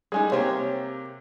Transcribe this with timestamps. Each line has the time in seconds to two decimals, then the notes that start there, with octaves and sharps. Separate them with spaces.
0.12 G3 G#3 D#4 G#4
0.32 C3 A#3 G4 C5 C#5